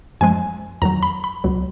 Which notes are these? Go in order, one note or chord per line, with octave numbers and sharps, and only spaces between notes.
F#2 F3 G#3 G#5
F2 D#3 F#3 A#5
B5
B5
C#2 B2 F#3